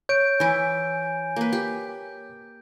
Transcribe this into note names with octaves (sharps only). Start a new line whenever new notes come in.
C#5 G6 D7
E3 E4 G#5
A#3 B4
G4